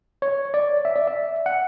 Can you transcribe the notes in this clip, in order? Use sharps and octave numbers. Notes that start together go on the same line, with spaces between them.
C#5
D5
E5
D5
E5
F#5